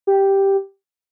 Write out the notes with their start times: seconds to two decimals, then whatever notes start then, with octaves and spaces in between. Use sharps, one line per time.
0.07 G4